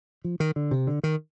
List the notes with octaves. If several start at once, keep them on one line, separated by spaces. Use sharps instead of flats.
F3
D#3
D3
C3
D3
D#3